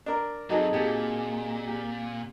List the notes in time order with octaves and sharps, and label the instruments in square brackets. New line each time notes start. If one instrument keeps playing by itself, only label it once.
[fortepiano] D4 A#4
[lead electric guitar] F#3 C4 [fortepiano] D#4 [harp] F#4 G#4 A4
[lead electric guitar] A#2 [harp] C4 G4 G#4
[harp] G4